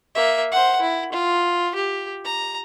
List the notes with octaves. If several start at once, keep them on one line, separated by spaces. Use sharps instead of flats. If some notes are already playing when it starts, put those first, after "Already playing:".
A#3 E5
C5 F#5
E4
F4
G4
A#5